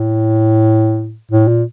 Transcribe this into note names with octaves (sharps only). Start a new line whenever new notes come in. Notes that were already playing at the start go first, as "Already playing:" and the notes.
Already playing: A2
A2
A#2